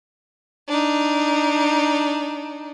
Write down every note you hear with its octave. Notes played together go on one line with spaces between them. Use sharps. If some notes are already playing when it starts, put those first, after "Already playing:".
D4 D#4